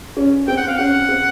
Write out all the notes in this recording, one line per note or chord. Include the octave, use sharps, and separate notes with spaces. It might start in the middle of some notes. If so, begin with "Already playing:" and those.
C#4
C4 G5
F#5
F5
C#4 F#5
C4